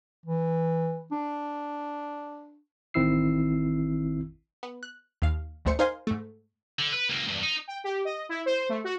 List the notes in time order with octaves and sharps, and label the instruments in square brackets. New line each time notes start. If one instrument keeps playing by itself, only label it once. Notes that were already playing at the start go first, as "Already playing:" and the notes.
[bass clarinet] E3
D4
[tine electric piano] A1 D#3 C4 E4 E6 C7
[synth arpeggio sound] B3
F#6
D#2 F5
A1 D2 A3 C5 C#7
D#4 A#4 C5 F5 G#5 C6
G#2 A3
[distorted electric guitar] D3
B4
C#2 A#3
E2 G2
D#4
[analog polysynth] G5
G4
D#5
E4
C5
A3
F#4